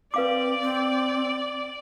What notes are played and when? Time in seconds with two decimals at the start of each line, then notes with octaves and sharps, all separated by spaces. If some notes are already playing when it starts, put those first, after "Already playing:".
0.14 C4 B4 D5 F5 D6
0.61 C4